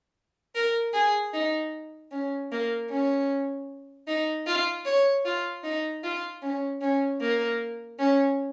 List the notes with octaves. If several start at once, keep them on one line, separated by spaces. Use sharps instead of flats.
A#4
G#4
D#4
C#4
A#3
C#4
D#4
F4
C#5
F4
D#4
F4
C#4
C#4
A#3
C#4